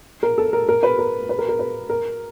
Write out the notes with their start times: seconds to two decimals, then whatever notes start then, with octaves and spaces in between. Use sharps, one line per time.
0.23 A#4
0.38 A4
0.53 A#4
0.69 A#4
0.83 B4
0.99 A#4
1.29 B4
1.39 A#4
1.49 A#4
1.59 B4
1.90 A#4